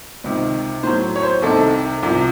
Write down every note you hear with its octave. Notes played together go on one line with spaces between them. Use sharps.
C#2 C3 D#3
A2 F#3 C5
C#5
C5
C2 C3 D#3 A4
C2 C3 F3